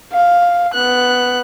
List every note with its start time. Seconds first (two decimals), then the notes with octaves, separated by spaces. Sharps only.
0.12 F5
0.74 B3 F#6